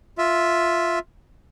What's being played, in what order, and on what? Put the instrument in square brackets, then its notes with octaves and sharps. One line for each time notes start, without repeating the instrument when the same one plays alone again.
[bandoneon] F4 E5